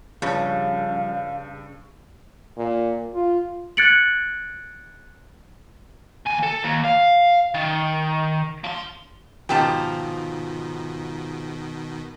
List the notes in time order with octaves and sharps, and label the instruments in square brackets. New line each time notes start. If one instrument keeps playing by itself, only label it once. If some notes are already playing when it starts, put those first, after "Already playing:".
[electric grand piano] G2 A5 [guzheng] C#3 [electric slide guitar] F3 G3 [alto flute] F5
[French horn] A#2
F4
[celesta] F#6 G#6 A6 C#7 D7 F#7
[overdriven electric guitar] D#2 G#5
A4
D#2
F5
D#3
F3 C6
[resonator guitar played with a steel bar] G#2 F3 A5 [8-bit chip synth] B2 D#3 [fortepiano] G4